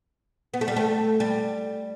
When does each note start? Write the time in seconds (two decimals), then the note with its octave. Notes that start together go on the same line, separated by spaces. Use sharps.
0.54 B3
0.61 A3
0.68 G3
0.76 A3
1.20 G3